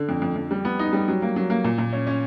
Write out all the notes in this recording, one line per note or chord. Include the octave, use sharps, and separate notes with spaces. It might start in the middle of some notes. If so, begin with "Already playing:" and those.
Already playing: D3
F2
F2
F2
G3
B3
D#4
G3
F#3
A#3
F#3
A#3
A#2
A#2
C#4
C#4